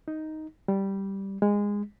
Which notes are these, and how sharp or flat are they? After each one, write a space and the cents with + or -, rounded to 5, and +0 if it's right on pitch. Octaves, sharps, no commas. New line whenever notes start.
D#4 +5
G3 -5
G#3 -20